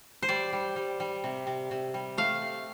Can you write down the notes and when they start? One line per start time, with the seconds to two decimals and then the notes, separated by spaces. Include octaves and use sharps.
0.22 C5
0.29 G3 D5
0.53 G3
0.76 G3
1.00 G3
1.24 C3
1.47 C3
1.71 C3
1.94 G3
2.18 A3 F5
2.42 C3